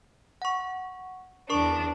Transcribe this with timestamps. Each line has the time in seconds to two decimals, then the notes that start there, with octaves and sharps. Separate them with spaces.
0.42 F#5 C#6
1.50 E2 D4 A#4 C#6